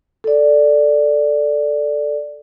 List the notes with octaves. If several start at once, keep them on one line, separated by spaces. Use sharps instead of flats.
A4 D5